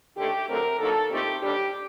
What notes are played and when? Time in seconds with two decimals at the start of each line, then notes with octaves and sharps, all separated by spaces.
0.17 D#2 D3 A3 G4
0.48 D2 D3 F#3 A3 C4 A#4
0.79 D3 F#3 A#3 D#4 A4
1.10 A#2 A3 C4 D#4 G4
1.41 D#2 D3 G3 D4 G4